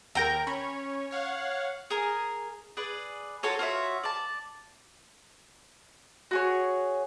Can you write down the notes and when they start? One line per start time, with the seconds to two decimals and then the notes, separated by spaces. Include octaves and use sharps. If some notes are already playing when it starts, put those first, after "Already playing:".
0.15 D#2 A#4 G5 A#5
0.47 C#4 C#5 B5
1.11 C#5 F5 F#5
1.90 G#4 A#4
2.77 G#4 B4 D5
3.43 F4 F#4 A4 C#5
3.59 F4 F#4 C#5 E5
4.04 D5 A5
6.31 F#4 G#4 C#5